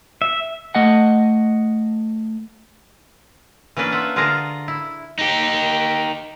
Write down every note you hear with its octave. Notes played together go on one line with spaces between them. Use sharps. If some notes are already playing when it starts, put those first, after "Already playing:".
E5
A3 D#5 F#5
E3 A#3 C#4 D4 B4
F4 E5 F#5
D3 F4 G#4 A#4 A5 A#5
E4
D#4 G4